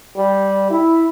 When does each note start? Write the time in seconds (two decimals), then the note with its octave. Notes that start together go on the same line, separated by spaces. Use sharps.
0.16 G3
0.70 E4